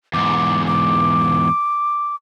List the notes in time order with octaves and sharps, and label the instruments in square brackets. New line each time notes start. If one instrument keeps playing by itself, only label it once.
[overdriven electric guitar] E2 G#2 [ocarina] D6
[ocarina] D6